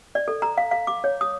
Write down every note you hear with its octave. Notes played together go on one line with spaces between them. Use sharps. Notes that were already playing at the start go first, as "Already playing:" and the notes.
D5
A4
A#5
F5
F5
D6
C#5
D#6